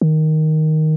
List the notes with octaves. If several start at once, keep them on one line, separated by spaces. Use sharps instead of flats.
D#3